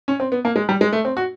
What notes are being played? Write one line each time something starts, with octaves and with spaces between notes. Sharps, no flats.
C#4
C4
B3
A#3
G#3
G3
G#3
A3
C4
F#4